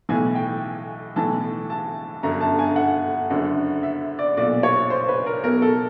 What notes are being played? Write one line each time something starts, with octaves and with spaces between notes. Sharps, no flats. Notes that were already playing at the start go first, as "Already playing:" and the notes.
B1 A2 E3 G#5
G5
B1 A2 E3 A5
A5
G1 F#2 D3 A#5
A5
G#5
F#5
F#1 F#2 D3
E5
D5
B1 A#2 D5
C#5
C5
B4
A#4
B1 B2 A#4
A4